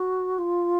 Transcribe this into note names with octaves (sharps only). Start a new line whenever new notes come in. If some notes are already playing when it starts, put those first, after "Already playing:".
Already playing: F#4
F4